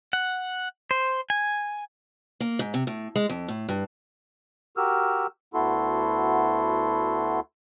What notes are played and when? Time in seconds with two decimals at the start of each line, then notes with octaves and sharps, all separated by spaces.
0.13 F#5
0.91 C5
1.30 G#5
2.40 A#3
2.59 G#2
2.74 C3
2.87 A2
3.16 G#3
3.29 F2
3.48 A2
3.69 G2
4.77 F#4 G4 A#4 E6 F6
5.54 D2 B3 E4 F#4 A4 C6